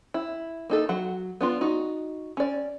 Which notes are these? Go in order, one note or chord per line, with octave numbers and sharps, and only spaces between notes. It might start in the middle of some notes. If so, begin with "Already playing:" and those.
E4
A#3 D#4 A4
F#3 F#5
B3 D4 F4
D#4 F#4
C#4 D5